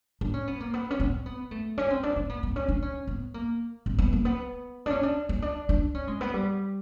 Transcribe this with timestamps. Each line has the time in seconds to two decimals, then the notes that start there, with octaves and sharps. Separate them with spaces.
0.21 D4
0.34 C#4
0.48 B3
0.60 A#3
0.74 B3
0.91 C#4
1.00 C4
1.26 B3
1.51 A3
1.78 C#4
1.90 C4
2.03 D4
2.16 C4
2.30 B3
2.43 C4
2.56 C#4
2.68 D4
2.82 C#4
3.07 B3
3.34 A#3
3.86 C4
3.98 B3
4.13 A#3
4.25 B3
4.86 D4
4.90 C#4
5.03 D4
5.29 C#4
5.42 D4
5.69 D4
5.95 C#4
6.07 G#3
6.21 B3
6.34 G3